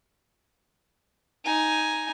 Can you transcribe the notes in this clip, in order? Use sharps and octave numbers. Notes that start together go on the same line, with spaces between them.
D#4 G#5